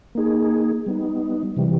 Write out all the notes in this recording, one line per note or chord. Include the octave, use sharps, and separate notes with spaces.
A#3 D#4 G#4
G3 B3 D#4
C3 E3 G3